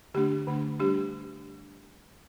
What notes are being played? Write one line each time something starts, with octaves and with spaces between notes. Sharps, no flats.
D3 A3 D4 G4
D3 A3 D4
G3 D4 G4